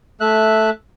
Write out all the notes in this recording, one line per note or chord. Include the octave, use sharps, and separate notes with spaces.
A3 E5 F#6